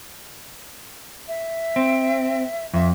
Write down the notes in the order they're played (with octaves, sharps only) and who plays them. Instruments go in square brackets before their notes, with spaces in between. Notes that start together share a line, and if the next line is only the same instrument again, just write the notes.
[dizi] E5
[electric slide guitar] C4
[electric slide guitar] F2 [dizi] E5